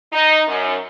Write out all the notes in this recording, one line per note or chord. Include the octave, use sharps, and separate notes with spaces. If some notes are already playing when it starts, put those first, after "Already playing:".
D#4
F#2